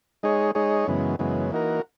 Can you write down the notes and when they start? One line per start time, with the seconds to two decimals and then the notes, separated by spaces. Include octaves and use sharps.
0.23 G#3 D#4 G#4 C#5
0.55 G#3 D#4 G#4 C#5
0.87 F#2 C#3 E3 G#3 B3
1.19 F#2 C#3 E3 G#3 B3
1.51 E3 A#3 D#4 F#4 A#4